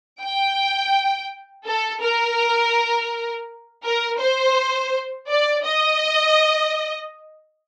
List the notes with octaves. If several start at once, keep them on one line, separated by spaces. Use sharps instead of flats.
G5
A4
A#4
A#4
C5
D5
D#5